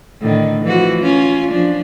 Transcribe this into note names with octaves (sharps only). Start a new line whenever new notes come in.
A2 D3 D#3
E3 F3 F#4
C#4 F4
F3 D4